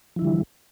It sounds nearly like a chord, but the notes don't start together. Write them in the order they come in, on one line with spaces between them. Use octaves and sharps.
F3 E4 D3 G3 E3